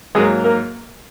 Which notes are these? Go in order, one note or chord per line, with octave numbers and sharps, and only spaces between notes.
G#2 F#3 G#3 A#3 G#4
A#3 A#4